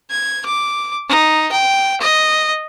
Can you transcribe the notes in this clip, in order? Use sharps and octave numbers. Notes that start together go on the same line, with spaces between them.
G#6
D6
D#4
G5
D#5